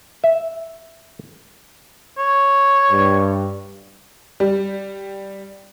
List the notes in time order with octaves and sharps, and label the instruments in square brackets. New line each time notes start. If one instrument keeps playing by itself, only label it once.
[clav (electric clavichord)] E5
[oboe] C#5
[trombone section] G2
[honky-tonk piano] G3